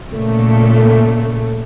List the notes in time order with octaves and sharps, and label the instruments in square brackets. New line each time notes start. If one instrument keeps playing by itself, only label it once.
[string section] A#2 C#3 A3